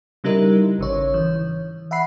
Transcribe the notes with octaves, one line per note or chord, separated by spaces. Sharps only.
C#3 G3 D#4 E4 A#4
G#1 C#3 C#5
E3
E5 F#5 B5 C7